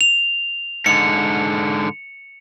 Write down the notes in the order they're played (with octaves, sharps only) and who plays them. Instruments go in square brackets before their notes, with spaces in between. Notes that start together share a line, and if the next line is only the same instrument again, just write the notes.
[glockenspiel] F7
[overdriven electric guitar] G#2 D3 [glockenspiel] C#7